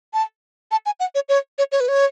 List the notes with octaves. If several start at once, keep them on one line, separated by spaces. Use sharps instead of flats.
A5
A5
G#5
F#5
C#5
C#5
C#5
C#5
B4
C#5